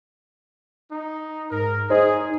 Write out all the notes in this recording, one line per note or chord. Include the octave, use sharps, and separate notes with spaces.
D#4
G#2 A#4
D#4 G#4 C5 D#5